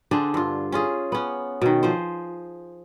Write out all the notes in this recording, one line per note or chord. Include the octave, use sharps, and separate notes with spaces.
D3 D4 G#4 C5
G2 F4
C#4 F4 G#4
B3 C#4
B2 D#3
F3 G#4 C5